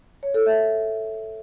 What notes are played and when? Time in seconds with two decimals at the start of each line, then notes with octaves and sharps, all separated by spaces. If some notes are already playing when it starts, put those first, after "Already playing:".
0.23 C#5
0.34 A4
0.46 E5